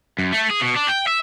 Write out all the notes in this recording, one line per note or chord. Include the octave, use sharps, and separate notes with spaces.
F#2
A3
G#4
B2
D4
G5
E5